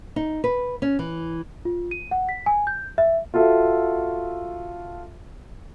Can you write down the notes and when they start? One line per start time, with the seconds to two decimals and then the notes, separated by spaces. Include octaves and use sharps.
0.16 D#4
0.44 B4
0.82 C#4
0.99 E3
1.65 F4
1.91 D#7
2.11 F#5
2.29 B6
2.46 G#5
2.67 G6
2.98 E5
3.34 F4 F#4 A4 E5